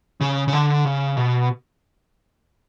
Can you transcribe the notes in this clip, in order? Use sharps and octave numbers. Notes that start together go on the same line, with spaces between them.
C#3
C#3
D3
C#3
B2